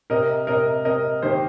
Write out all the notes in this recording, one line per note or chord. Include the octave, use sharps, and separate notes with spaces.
C3 A#4 D#5
C3 A#4 D#5
C3 A#4 D#5
D#3 G4 C5